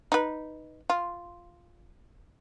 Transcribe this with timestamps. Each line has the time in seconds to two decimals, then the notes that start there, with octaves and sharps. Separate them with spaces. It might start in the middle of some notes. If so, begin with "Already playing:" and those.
0.12 D#4 B4
0.90 F4